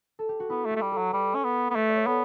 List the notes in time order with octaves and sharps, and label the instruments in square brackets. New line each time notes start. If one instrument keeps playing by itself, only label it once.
[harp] A4
G4
F#4
[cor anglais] B3 [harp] E4
[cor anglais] A3
[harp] G4
[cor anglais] A3
G3
[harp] A4
[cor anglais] F#3
[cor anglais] G3 [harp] B4
[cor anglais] C#4
B3
B3
[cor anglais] A3 [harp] B4
[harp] D5
C#5
[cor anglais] B3 [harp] A4